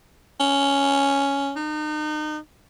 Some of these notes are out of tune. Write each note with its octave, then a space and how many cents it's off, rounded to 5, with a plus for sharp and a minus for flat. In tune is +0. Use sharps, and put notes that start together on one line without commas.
C#4 +5
D#4 -35